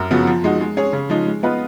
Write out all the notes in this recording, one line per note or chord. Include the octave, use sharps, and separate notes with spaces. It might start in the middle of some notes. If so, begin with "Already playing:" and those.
Already playing: F#2
C#3 F3 B3 F#4
F3
G#3 D#4 F#4
G#3
C#4 G#4 C#5
C#3
F3 G#3 D#4
G#3
B3 F4 B4 D#5